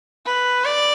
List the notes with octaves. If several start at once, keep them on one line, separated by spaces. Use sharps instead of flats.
B4
D5